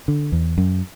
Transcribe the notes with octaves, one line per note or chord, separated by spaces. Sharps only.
D3
E2
F#2